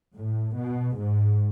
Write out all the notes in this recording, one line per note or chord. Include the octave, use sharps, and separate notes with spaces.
A2
B2
G#2